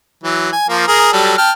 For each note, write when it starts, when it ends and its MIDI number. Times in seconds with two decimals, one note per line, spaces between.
0.24 0.51 52
0.24 0.51 54
0.52 0.64 80
0.69 0.85 53
0.69 0.85 58
0.87 1.11 68
0.87 1.11 70
1.12 1.36 54
1.12 1.36 55
1.12 1.36 69
1.38 1.51 79
1.38 1.51 81
1.38 1.51 89